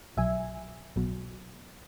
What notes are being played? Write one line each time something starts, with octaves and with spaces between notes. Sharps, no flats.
B1 B2 F#3 E5 G#5
B1 B2 F#3